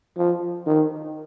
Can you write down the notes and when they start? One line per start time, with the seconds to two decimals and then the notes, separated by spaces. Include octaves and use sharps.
0.17 F3
0.66 D#3